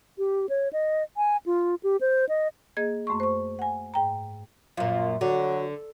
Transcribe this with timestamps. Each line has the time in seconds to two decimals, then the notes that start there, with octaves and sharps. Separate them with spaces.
0.18 G4
0.49 C#5
0.73 D#5
1.17 G#5
1.46 F4
1.83 G4
2.01 C5
2.29 D#5
2.77 A#3 G#4 D#5 G#6
3.07 F#2 A3 C6 C#6
3.20 C5 C#6
3.59 F#5 G#5
3.94 G#2 G5 A#5
4.77 F#2 A#2 F4
5.21 D3 F#3 F#4